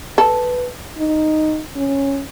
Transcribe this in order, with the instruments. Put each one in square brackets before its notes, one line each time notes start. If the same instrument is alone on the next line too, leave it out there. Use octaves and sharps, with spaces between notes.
[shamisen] A4 [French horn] B4
[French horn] D#4
C#4